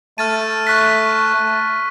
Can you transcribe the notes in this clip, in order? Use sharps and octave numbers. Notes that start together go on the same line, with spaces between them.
A3 A5 F6 A6 D#7
C#6 F#6 B6